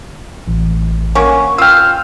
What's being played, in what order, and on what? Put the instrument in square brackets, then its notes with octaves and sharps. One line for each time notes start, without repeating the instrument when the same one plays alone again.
[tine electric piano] A1
[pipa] A#3 C#4 F#4
[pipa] F4 G5 [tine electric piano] E6 F6